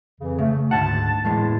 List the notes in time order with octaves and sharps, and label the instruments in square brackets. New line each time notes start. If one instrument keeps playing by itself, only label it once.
[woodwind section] F2 C#3 E3
[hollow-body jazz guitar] C#3 [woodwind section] A3
[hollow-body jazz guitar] D2 G#2 F#5 [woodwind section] A5
[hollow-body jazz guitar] E2 A2 G#3